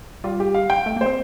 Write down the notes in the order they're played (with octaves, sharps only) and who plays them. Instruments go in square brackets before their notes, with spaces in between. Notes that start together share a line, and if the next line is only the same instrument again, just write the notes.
[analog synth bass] G3 [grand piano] F4
[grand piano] G4
F5
G5
[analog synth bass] A3
A#3
[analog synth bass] C4 [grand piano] C5